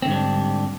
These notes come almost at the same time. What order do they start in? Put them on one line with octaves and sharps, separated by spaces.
C4 D3 G#2 G3 D4